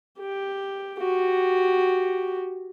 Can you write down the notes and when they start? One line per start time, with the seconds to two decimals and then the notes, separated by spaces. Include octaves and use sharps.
0.19 G4
0.99 F#4 G4